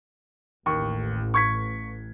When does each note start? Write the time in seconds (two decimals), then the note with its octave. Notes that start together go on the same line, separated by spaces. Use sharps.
0.66 A1 D#2 C#6
1.34 C#6 G#6 B6